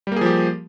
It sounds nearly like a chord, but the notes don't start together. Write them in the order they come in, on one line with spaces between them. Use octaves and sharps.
G3 A#3 G#4 F3 G4